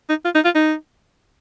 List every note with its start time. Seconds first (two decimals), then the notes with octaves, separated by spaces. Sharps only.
0.09 D#4
0.25 F4
0.35 D#4
0.45 F4
0.55 D#4